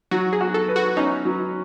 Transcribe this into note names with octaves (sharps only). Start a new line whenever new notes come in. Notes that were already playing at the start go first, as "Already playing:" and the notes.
F#3 F#4
G#4
F#4
A4
B4
F#4
C#4 D#4
F#3